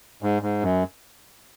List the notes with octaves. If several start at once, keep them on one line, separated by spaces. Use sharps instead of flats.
G#2
G#2
F#2